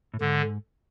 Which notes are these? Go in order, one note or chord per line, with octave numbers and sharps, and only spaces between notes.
A2
G#2 D3